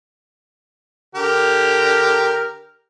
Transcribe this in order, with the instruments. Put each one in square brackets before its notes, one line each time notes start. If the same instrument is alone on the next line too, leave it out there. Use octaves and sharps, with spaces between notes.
[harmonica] D3 G4 A#4